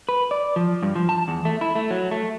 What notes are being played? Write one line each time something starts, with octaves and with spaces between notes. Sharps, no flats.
B4
D5
F3
G2
F3
A5
E2
A3
E4
A3
F#3
A3